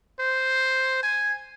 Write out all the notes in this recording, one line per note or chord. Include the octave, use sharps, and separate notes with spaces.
C5
G#5